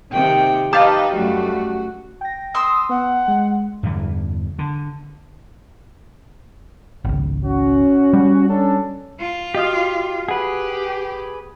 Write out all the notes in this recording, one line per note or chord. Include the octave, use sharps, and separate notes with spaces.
C3 D#3 A#3 G5
D#4 G4 B4 D#5 F5 A5
F#2 G3 A3 F#4
G5 A#6
C6 D#6 E6
B3 F#5
G#3
E2 G2 D3 E3
D3
G#1 C#2
C#4 F#4
G3
C#4 D4 A4
F4
F#4 G4 D#5 F5 D#6
G4 G#4 B4 F#5